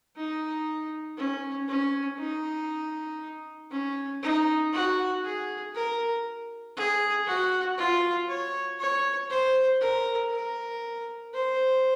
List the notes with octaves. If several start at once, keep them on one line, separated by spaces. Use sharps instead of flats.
D#4
C#4
C#4
D#4
C#4
D#4
F#4
G#4
A#4
G#4
F#4
F4
C#5
C#5
C5
A#4
A#4
C5